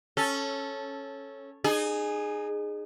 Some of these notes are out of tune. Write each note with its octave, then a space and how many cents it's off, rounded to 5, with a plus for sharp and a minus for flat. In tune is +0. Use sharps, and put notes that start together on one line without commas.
C#4 -10 A4 -10
D#4 -35 G#4 +0